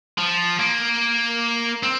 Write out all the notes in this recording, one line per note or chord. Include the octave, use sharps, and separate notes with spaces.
F3
A#3
C4